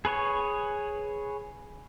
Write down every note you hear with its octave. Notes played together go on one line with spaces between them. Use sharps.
G#4 B4 C#5 C#6